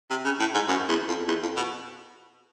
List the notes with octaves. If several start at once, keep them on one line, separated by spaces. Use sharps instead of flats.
C3
C#3
A2
G#2
F#2
E2
F2
E2
F2
B2